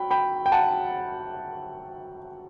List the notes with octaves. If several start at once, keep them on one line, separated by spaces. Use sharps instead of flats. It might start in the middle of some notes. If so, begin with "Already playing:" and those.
Already playing: F#3 G5 B5
G5 B5
G5
F#5 A5